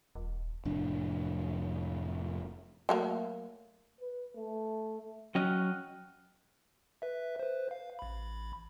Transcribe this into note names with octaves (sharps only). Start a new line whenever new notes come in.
D#1
F1 A2 D4
F#3 A3 A#3
B4
A3
F#3 C#4 D#5 G5 F6 F#6
B4 E5
B4 C5
F5
A1 B5